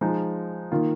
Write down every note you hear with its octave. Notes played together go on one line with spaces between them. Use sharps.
F3 G#3 D#4
D#3 A#3 F4